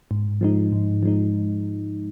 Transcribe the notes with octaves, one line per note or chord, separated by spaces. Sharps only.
G#2
F3 G#3 D#4
G#2
F3 G#3 D#4